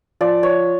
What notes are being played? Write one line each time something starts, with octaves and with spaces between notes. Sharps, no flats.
F3 D5
C#5